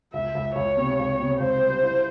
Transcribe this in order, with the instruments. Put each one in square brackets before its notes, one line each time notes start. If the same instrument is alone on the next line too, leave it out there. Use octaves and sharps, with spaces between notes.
[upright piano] C#2 [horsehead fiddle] E5
[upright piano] C#2
[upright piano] C#2 [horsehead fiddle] C#5
[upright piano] C3
C#2
C3
[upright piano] C#2 [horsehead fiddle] C5
[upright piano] G3
E4